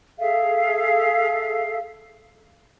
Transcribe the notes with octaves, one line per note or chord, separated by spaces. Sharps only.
G#4 A4 E5 F5